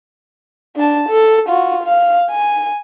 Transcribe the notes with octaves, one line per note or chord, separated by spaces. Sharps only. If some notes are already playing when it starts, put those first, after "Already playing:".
D4 A5
A4
F4 F#4
F5
G#5